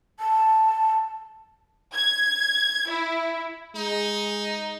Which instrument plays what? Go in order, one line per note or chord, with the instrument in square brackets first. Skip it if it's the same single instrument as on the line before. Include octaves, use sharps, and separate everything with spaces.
[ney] A5
[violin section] G#6
E4
[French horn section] G#3 [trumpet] D#4